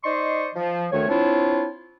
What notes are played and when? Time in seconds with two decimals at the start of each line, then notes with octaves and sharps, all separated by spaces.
0.04 D#4 C5 D5 D#5 C6 C#6
0.55 F3
0.92 D2 D#3 A3 C#5
1.08 C4 D4 E4 F4 C#5